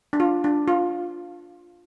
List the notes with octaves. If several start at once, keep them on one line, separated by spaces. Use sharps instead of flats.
D4
F4
D4
F4